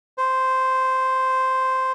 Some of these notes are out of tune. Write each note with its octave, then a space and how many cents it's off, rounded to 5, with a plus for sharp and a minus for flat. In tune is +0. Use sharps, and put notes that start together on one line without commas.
C5 -5 C6 +40